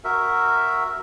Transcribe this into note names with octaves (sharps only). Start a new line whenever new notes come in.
F#4 A#4 E5